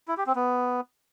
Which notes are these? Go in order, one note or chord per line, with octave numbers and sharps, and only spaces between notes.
E4
G4
C4
B3